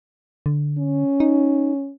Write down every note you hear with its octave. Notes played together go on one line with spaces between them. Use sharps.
D3
C#4
D#4